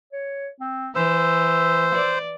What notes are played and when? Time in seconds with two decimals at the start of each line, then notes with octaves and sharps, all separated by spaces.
0.12 C#5
0.60 C4
0.96 E3 C5 E6
1.95 D5